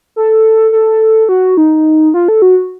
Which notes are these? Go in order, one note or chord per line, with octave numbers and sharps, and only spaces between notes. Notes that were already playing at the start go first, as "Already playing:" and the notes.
A4
A4
F#4
D#4
F4
A4
F#4